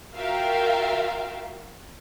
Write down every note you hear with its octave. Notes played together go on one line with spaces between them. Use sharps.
F4 F#4 A#4 E5 F5 G5